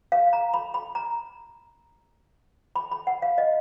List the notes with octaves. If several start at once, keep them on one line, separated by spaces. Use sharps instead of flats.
F5
A#5
B5
B5
A#5
B5
B5
F#5
F5
D#5